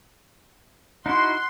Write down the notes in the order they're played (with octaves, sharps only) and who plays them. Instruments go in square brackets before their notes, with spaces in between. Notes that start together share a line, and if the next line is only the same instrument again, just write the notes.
[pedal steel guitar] D#4 E4 F#4 [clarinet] F#5 [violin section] C6